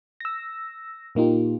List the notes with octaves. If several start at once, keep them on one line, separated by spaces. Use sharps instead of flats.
E6 A#6
A#2 A#3 D#4 F4 G4